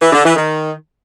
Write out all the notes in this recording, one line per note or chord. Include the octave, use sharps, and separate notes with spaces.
E3
D3
E3
D#3